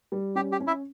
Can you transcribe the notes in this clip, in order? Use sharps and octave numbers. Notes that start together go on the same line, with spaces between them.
G3
C#4 G4
G4
C#4
E4 E5